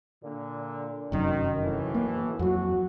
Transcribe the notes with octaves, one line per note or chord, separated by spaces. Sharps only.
A#2 D3
F1 F#2 D#3
B1 A2 E3
A#3
F2 F#3 F#4